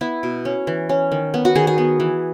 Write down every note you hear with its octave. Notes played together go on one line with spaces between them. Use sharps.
B3 E4
B2
C#4
E3
C#4
D#3
B3
F#4
D#3 G#4
G#4
B3
E3